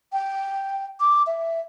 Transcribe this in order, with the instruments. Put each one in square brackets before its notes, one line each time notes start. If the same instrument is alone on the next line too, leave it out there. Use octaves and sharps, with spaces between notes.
[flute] G5
D6
E5